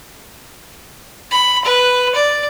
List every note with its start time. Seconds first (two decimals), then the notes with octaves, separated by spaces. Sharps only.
1.31 B5
1.64 B4
2.15 D5